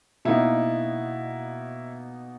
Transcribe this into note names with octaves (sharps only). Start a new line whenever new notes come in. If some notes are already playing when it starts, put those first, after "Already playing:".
B2 A#3 D#4 E4